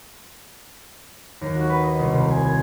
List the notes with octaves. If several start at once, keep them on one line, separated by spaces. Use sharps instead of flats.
D#2
F#4
B4
D#5
C2
C3
G#5
G#6